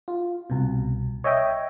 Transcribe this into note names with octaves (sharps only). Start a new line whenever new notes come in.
F4
C2 B2
C#5 D#5 E5 G5